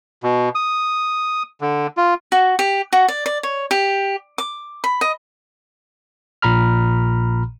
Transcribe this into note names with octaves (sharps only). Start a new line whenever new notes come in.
B2
D#6
D3
F4
F#4
G4
F#4
D5
D5
C#5
G4
D6
B5
D#5
A#1 A#2 A#5 B5 F6